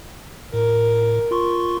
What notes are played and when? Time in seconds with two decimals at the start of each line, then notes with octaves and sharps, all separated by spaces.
0.53 A2 A#4
1.31 F4 C6 C#6